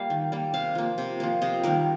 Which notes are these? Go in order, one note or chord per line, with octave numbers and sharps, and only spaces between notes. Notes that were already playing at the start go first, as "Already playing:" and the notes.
Already playing: G3 A#3 F5
D#3
G3 A#3
C3 F5
F3 A#3
C3
F3 A#3
C3 D#5
D#3 G3 A#3 A#4